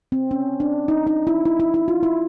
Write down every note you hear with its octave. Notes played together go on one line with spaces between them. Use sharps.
C4
C#4
D4
D#4
D#4
E4
E4
E4
E4
F4
E4